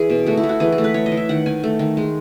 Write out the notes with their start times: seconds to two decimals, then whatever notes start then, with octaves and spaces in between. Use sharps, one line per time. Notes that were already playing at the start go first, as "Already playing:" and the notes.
Already playing: E3 G#4 B4
0.10 B2
0.26 A3 F#4
0.37 E4
0.43 A3
0.49 F#4
0.60 E3 G#4
0.72 G#4
0.78 A3
0.84 B4
0.94 A3 C#5
1.06 D#5
1.12 E3
1.17 E5
1.29 D#3 F#5
1.46 D#3 G#5
1.64 A3
1.79 D#3
1.97 G#3